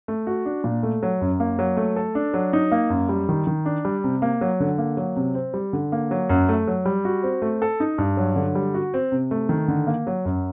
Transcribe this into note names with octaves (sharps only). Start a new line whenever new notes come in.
A3
F#4
D4
A#2
A3
F#3
F#2
A#3
F#3
A3
A4
D4
F#3
D#4
A#3
F#2
G3
D#3
D#3
D4
G3
C3
A#3
F#3
D3
A#3
F#3
C3
C4
G3
D3
A#3
F#3
F#2
A3
F#3
G3
F#4
C4
A3
A4
D#4
G2
F#3
D3
G3
F#4
C4
C3
A3
D#3
D3
A#3
F#3
F#2